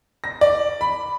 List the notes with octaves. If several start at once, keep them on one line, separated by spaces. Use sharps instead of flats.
A#6
D5
B5